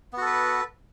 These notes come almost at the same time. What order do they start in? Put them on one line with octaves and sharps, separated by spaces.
B3 F#4 A4 B4